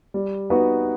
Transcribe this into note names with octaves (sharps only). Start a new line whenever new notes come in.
G3
B3 D#4 F#4 B4